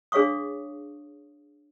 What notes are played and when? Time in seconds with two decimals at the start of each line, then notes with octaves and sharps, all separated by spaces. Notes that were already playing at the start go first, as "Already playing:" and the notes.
0.12 D4 G#4 C#5 F5 C#6 D#6